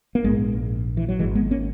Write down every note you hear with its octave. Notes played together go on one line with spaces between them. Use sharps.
A#3
A#1 G#2 G#3 B3
E3
F#3
G#1 G#2 E3 G#3
G#3 B3
A#3 C#4